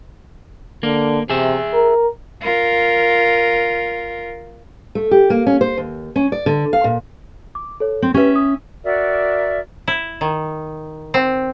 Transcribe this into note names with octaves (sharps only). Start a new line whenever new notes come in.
D3 A#3
C3 G#4 E5
A#4
F4 A#4
A3
G4
A#3
C#4
C5
D#2
C#4
D5
D3
F5
A#2
D6
A4 C#5
C4
C#4 G4 B4 E5
D#6
F#4 A#4 D5 E5
E4
D#3
C4